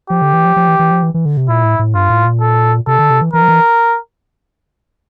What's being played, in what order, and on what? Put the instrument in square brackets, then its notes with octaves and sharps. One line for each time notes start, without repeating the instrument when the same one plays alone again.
[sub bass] F3 [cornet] G4
[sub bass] D3
E3
F3
F3
E3
E3
F3
E3
E3
D3
C3
[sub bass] A#2 [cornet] E4
[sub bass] A2
A2
[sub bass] G2 [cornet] F4
[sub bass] A2
A#2
[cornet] A4
[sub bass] C3 [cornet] A4
[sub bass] D3
C3
E3
[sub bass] E3 [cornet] A#4
[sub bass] F3
E3